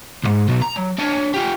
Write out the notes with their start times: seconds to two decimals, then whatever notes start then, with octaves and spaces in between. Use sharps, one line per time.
0.24 C2 G#2
0.48 B2 F#3
0.61 A#5
0.76 F#3
0.98 D4 C#5
1.34 F4 G4